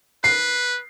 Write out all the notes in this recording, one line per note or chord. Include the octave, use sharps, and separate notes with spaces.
B4 C7